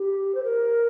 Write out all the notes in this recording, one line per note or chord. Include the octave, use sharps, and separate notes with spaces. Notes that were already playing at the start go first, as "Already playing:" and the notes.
Already playing: G4
C5
A#4